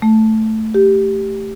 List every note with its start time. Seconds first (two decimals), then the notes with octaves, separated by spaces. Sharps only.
0.02 A3
0.74 G4